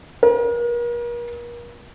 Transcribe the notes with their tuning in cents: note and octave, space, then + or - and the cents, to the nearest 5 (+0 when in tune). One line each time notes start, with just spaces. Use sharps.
A#4 +40